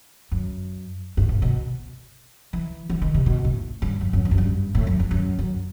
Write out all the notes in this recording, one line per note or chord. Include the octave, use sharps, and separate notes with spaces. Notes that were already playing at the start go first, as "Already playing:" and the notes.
F#2
G2
A2
B2
E3
E3
D#3
C3
B2
A2
G2
F#2
F#2
E2
F#2
G2
A2
F#2
E2
F#2
F#2